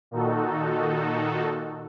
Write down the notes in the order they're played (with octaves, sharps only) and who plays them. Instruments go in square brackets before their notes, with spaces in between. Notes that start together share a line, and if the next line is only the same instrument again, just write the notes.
[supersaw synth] A#2 D#3 D#4 F#4 A4